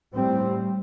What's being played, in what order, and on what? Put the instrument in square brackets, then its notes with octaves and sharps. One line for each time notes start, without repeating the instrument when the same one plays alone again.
[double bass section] A2 G3 C4